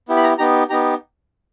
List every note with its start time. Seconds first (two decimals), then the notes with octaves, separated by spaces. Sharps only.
0.09 B3 E4 G4
0.16 B5
0.24 A#5
0.38 B3 D#4 G4 A#5
0.70 B3 D#4 G4 A#5